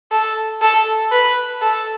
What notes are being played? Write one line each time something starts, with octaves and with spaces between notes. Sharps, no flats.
A4
A4
B4
A4